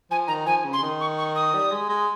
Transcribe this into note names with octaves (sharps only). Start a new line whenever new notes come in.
F3 G#5
D#3 A#5
F3 G#5
C#3
C6
C#3
D#3
C#6
C#6
D#6
G3
G#3
G#3